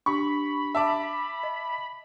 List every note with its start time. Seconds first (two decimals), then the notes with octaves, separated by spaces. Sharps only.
0.06 D4 G4 B5 C#6
0.75 E5 A5 D6
1.43 D#5